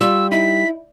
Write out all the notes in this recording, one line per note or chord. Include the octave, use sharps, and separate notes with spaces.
G3 F4 E6
D#4 E4 B6